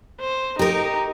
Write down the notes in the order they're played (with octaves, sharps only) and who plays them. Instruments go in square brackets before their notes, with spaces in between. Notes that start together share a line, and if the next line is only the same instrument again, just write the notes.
[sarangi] C5
[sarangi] D#4 [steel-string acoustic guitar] G4 A#4